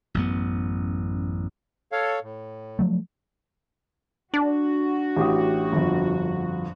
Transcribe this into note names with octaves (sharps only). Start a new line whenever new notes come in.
A1 F#2 B3
A4 C#5 F5
A2
F3 F#3 A3
D4 F#4
A1 G4 D#6
G1 F2